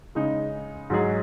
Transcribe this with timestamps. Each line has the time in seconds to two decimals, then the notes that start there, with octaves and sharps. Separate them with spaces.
0.15 C#3 G#3 D#4
0.90 G#2 F#3 D#4 G#4